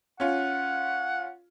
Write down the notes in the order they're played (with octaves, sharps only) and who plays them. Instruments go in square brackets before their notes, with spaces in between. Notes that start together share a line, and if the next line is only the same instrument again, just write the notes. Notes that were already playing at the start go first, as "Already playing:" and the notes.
[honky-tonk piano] C#4 F4 [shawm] F#5